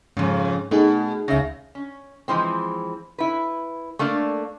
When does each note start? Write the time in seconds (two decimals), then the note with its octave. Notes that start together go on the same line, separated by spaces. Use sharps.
0.17 F2 G#2 C#3
0.71 B2 A3 D#4 G#4
1.28 C#2 C#3 E5 A#6
1.75 C#4
2.28 E3 F3 G#3 C4
3.18 E4 B4
3.99 A3 A#3 D4 D5